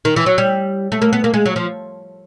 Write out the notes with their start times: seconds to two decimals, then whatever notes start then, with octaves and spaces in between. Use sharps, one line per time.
0.05 D#3
0.16 E3
0.26 F#3
0.38 G3
0.92 A3
1.02 A#3
1.13 B3
1.24 A#3
1.34 G#3
1.46 F#3
1.56 F3